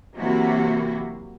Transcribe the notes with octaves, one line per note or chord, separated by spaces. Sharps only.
C3 E3 F#3 A#3 E4 F#4